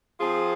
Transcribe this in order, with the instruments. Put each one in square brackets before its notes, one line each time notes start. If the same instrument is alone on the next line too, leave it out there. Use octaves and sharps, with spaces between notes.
[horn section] F3 C4 F4 G#4